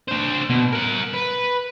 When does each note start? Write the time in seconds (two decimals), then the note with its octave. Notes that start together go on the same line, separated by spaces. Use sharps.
0.08 D4 C5
0.50 B2
0.72 A#4 F#5
1.13 B4